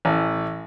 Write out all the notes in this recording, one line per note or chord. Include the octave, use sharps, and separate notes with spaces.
A1